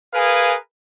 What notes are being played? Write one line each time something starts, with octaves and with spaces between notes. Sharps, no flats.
G#4 A#4 B4 F5 G#5